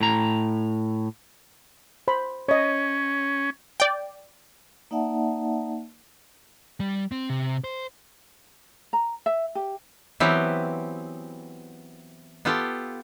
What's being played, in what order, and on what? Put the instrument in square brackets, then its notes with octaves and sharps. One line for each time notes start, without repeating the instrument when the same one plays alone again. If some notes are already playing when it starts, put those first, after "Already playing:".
[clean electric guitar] A2 A#5
[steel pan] C5 B5
[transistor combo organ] C#4 [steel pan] C#5 D#5
[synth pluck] D5 G5
[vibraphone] A#3 D#4 D5 E5 F#5 A5
[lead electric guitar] G3
C4
C3
C5
[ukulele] A#5
E5
G4
[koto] E3 F#3 B3 C4 E4 G4
B3 F4 G4 A4